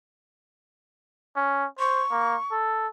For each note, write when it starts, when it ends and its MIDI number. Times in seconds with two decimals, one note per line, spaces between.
1.36 1.66 61
1.79 2.04 72
1.79 2.53 85
2.11 2.36 58
2.52 2.88 69